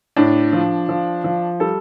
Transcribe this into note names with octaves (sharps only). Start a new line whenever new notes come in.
A2 D4
F3
F3
F3
G3 A4